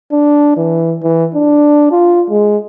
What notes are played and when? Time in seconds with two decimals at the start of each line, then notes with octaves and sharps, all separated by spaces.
0.12 D4
0.57 E3
1.03 E3
1.35 D4
1.92 F4
2.30 G#3